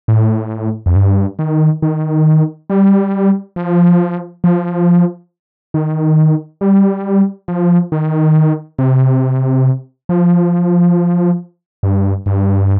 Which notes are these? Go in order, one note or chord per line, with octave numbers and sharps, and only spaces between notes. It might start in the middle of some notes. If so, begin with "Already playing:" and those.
A2
F2
G2
D#3
D#3
G3
F3
F3
D#3
G3
F3
D#3
C3
F3
G2
G2